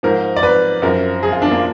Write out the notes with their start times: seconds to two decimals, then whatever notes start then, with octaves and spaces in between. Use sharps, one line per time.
0.03 G#2 F3 A#4
0.36 D5
0.43 B4
0.82 F#2 F3 A#4
1.23 G#4
1.32 F4
1.42 D4
1.51 A#3